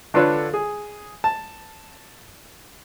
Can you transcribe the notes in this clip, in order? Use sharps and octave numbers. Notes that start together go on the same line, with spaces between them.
D3 D4 F4 A4 B4 C#5
G#4
A5